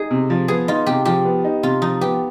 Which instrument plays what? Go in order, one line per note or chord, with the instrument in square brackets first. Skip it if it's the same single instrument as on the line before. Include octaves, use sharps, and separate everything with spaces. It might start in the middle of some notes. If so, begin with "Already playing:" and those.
Already playing: [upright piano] D#4 [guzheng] G#4
[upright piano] C3
F3
[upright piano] B3 [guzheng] G#4
[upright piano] D#4 [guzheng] F4
[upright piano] C3 [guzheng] G4
[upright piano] F3 [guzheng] G4
[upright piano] B3
D#4
[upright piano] C3 [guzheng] F4
[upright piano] F3 [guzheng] D#4
[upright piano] B3 [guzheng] G4